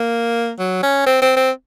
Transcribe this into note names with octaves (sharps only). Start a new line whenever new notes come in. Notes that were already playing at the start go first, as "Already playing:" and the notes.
Already playing: A#3
F#3
C#4
C4
C4
C4